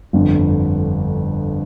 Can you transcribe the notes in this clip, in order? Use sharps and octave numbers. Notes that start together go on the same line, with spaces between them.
G1 F2 D3